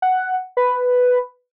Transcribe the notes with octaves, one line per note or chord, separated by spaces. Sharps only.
F#5
B4